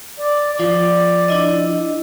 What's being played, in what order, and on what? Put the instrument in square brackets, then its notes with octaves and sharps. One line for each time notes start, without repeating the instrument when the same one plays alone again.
[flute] D5
[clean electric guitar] F3 F4 [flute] D5
[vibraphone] D4 E4 D#5